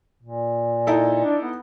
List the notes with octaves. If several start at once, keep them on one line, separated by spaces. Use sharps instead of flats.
A#2
D#4 E4 A4
D4
B3